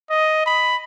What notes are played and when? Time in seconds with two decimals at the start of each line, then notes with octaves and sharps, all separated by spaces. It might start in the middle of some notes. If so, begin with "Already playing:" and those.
0.10 D#5
0.46 B5